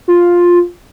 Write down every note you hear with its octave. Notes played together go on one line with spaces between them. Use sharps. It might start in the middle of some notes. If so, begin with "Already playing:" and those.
F4